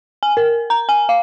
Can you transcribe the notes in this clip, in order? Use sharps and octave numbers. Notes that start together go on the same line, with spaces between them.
G#5
A#4
A#5
G#5
F5